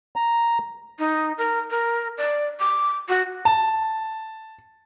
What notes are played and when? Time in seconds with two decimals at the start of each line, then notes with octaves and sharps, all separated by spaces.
0.16 A#5
0.99 D#4
1.38 A#4
1.71 A#4
2.18 D5
2.60 D6
3.09 F#4
3.45 A5